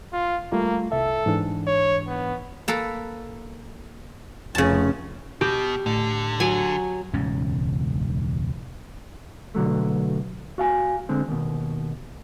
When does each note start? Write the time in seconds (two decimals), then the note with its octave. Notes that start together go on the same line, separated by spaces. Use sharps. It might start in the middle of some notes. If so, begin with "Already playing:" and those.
0.13 F4
0.52 G3 A3 A#3 F4
0.92 C2 A4 E5
1.26 G#2 E3 D4
1.67 C#5
2.08 B3
2.68 A#3 A4 B4
4.55 F1 C#3 C#4 A5
5.41 B2 G4
5.86 A2 D3
6.40 F#3 G#5
7.13 E1 C#2 G#2 C#4
9.55 B2 D3 F#3 A3
10.58 F#4 F5 G#5
11.09 D3 G#3 C4
11.28 D#2 B2